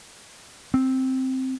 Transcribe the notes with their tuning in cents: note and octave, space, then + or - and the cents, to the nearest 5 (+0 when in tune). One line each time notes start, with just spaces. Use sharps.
C4 +0